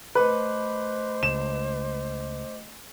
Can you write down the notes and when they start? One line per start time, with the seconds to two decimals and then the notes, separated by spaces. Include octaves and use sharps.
0.15 A3 B4 C5 D#5 D6
1.23 C#2 E7